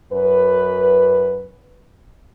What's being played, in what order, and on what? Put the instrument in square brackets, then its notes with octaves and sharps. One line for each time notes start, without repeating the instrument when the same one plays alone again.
[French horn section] F#2 B4